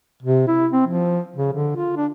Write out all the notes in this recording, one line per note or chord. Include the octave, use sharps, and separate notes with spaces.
C3
E4
C4
F3
C#3
D3
F4
D4